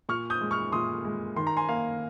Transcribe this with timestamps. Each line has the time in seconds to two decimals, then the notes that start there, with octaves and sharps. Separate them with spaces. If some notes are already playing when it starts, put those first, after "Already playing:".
0.09 A#2 C#6 F6
0.30 D#6 G6
0.41 G#3
0.51 C#6 F6
0.72 A#2 C6 D#6
1.05 G#3
1.36 D#3 C6
1.47 A#5
1.57 G#5 C6
1.69 A#3 F5